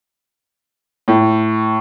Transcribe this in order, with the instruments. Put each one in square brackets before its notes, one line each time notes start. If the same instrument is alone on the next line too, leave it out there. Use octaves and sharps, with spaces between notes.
[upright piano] A2